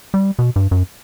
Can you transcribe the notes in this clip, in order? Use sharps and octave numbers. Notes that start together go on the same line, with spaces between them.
G3
B2
G2
F#2